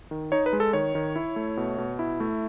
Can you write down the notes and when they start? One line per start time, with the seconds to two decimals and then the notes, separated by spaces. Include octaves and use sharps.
0.11 D#3
0.32 D#4 C#5
0.46 B4
0.53 G#3
0.60 A4
0.73 D#3 C#5
0.95 D#3
1.16 E4
1.36 A3
1.57 B2
1.78 B2
1.99 E4
2.20 A3